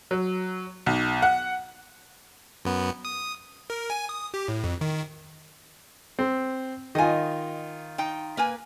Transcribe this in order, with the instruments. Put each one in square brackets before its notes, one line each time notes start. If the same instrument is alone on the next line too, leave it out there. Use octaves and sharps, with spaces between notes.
[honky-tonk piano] F#3
B1
F#5
[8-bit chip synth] F#2 B3
D#6
A#4
G#5
D#6
G4
A2
F2
D#3
[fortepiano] C4
[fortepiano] D#3 F4 [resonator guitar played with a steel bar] D#5 G#5
[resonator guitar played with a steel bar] D#4 G5
A#3 B4 G#5